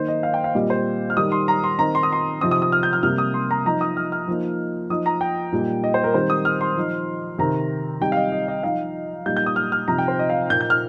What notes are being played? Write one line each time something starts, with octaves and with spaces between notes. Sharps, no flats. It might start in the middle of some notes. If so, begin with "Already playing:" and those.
Already playing: D#3 A#3 D#4 C5
D#5
F5
G5
F5
A#2 G3 C4 D#5
C5
F6
D#3 G3 D#4 D#6
C6
A#5
C6
D#3 C4 D#4 A#5
C6
D#6
C6
C3 F3 C4 D#4 D#6
D#6
D#6
F6
G6
F6
C3 G3 A#3 F6
D#6
C6
A#5
F3 D#4 A#5
D#6
F6
F6
F3 A#3 D#4
F3 D#4 D#6
A#5
G5
A#2 G3 D#4
D#5
C5
A#4
D#3 G3 C4 C5
D#6
F6
C6
F3 D#4
C3 D#3 C4 A#5
C3 G3 D#4 G5
F5
D#5
D#5
D#5
F3 D#4 F5
A#2 G3 D#4 G6
G6
D#6
F6
F6
C3 F3 D#4 A#5
G5
C5
D#5
F5
A#2 A#3 D#4 G6
G6
F6